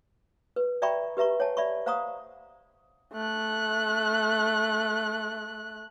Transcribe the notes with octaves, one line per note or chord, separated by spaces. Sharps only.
B4
D5 E5 G5 A#5 B5 C#6
G4 B4 E5 A#5 C#6
C#5 F#5 G#5 A5
D5 E5 B5 C#6
C5 F5 F#5 A#5 C#6 D#6
A3 F#6